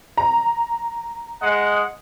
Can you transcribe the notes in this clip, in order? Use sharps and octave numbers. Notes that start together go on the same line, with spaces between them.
A#5
G#3 D#5 F#5